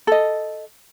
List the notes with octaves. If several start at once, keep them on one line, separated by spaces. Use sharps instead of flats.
A4 D#5